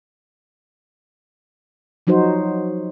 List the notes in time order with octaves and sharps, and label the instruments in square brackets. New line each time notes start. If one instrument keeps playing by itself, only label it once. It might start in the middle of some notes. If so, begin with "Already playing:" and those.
[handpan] F3 F#3 D#4 F#4 C5